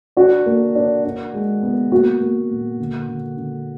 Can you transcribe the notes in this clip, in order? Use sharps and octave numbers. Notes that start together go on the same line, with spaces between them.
D4 F#4
A#3
D4
D4
G#3
B3
A#3 F#4
A#3
A#2
D3
D3
D3